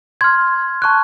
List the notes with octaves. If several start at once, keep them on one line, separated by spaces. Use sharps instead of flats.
C6 F6 G#6
A5 C#6 F#6